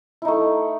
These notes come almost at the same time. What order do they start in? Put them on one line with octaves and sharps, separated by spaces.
E4 D#4 A3